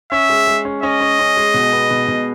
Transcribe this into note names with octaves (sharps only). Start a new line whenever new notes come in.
C#4 E5
G#3
G#3
C#4
C#4 D#5
C#4
C#4
G#3
B2
B3
B2
B2